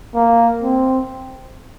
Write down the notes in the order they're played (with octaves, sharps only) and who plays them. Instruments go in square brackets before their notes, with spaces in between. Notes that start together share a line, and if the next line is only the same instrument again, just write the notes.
[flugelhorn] A#3
C4